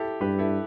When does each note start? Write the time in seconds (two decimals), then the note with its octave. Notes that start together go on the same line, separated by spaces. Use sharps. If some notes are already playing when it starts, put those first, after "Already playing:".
Already playing: E4 G4 A4
0.21 G2 G4 B4
0.38 E4 A4